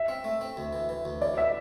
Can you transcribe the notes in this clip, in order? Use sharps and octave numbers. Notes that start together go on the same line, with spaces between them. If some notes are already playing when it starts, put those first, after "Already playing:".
Already playing: E5
C4
A3
C4
D2
E3
E3
D2
E3 D5
E5